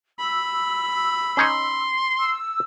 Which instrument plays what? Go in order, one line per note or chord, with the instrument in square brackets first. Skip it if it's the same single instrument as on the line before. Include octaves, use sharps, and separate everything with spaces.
[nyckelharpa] B5 [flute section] E6
[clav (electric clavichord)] C#4 D#4 C#5 [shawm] C6
[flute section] E6